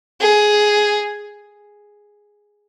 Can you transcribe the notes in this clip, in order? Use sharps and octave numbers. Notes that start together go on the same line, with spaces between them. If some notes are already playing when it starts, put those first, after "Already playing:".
G#4